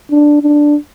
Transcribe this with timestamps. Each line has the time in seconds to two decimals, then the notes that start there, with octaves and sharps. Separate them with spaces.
0.11 D4
0.43 D4